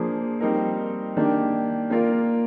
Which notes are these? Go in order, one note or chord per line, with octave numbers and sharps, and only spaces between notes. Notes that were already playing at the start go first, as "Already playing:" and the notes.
Already playing: F3 A#3 D4 G#4 C5
G3 C4 D#4 A#4
D#3 A#3 D4 G4
A#3 F4 A#4 D5